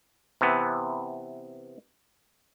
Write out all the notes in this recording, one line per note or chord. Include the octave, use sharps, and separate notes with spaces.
C3 E3 B3